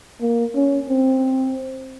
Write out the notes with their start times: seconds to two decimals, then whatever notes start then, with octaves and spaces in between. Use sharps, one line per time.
0.21 A#3
0.55 C#4
0.89 C4